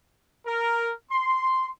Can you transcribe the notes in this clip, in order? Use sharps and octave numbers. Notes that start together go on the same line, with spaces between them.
A#4
C6